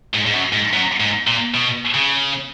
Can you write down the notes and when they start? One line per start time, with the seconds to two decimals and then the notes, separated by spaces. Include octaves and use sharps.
0.14 G#2
0.26 G#2
0.34 F#2
0.53 G#2
0.73 F#2
1.00 G#2
1.27 A#2
1.54 B2
1.94 C#3